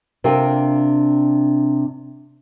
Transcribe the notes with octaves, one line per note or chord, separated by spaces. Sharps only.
C3 D4 F4 A#4 G5